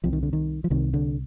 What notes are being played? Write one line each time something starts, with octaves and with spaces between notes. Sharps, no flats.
C2 C3 F3
D#3
D3
D#3
F3
C2 C3 D#3
D3